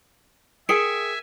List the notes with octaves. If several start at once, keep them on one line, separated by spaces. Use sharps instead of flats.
G#4 A#4 E5 G5 G#5 C#7 D7